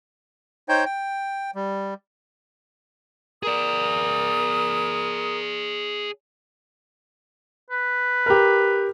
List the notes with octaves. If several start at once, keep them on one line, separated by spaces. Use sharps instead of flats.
D#4 C5 C#5 G5 G6
G5
G3
G#4 A#4 D5 D#6
B4
G4 A#4